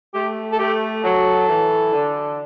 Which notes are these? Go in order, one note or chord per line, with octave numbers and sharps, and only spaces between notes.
A3 G4
A4
A3 G4
F#3 A4
E3
D3